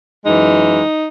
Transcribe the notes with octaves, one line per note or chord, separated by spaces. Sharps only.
F#2 E3 G#3 D#4